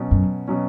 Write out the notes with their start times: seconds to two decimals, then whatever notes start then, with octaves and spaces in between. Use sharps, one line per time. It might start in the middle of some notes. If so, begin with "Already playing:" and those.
Already playing: B2 F#3 C#4
0.11 F#2
0.48 B2 F#3 C#4